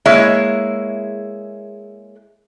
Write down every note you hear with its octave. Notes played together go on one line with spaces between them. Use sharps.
G#3 A#3 E4 G#4 C#5 E5